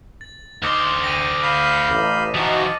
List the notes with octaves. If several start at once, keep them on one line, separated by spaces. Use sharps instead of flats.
A6
D2 D#4 C6 D6 D#6 F6
G5 A#6 D#7
F5 B5 G6
A1 D6
E3 F3 D#4 F#4 D#5 A5 C#6